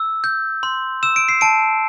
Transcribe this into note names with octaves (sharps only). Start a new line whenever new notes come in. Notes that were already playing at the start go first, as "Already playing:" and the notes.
Already playing: E6
G6
C6
E6 E7
D7
C7
A5 D7